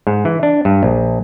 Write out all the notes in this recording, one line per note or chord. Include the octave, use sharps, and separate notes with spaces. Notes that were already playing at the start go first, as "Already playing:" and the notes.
G#2
E3
D4
G2
A#1